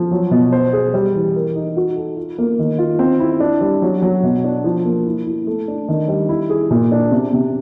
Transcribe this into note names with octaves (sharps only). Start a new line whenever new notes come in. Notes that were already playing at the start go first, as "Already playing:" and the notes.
Already playing: F3
F#3
B2
C5
G#4
G3
E3
A#4
D#4
F#4
A4
F4
A#3
D#3
F4
C4
E4
D4
G3
F#3
F#3
B2
D4
F3
A#3
E4
E4
A3
D4
D#3
G3
E4
G#4
A#2
D4
C3
C3